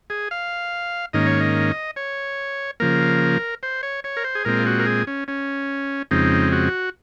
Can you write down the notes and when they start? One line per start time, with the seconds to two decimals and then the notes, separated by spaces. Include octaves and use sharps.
0.10 G#4
0.31 F5
1.13 G#2 D#3 A#3 C#4 D#5
1.27 C#5
1.40 D#5
1.96 C#5
2.80 C#3 F3 A#3 A#4
3.63 C5
3.83 C#5
4.04 C#5
4.17 A#4
4.24 C5
4.35 G#4
4.45 A#2 G#3 C4 A#4
4.59 F4
4.66 F#4
4.79 A#4
4.86 G#4
5.07 C#4
5.28 C#4
6.11 F2 C#3 G#3 C4 D#4
6.52 F#4